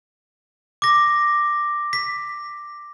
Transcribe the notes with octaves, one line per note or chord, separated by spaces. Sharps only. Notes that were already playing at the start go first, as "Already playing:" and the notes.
D6 A#6
B6